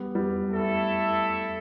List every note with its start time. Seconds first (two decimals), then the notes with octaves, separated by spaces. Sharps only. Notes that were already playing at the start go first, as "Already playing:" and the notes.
Already playing: G3 B3
0.15 G3 B3
0.49 A3 E4 A4 E5